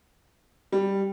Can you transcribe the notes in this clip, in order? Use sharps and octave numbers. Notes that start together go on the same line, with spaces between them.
G3